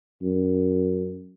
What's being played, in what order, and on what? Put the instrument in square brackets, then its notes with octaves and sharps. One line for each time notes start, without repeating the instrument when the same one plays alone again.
[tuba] F#2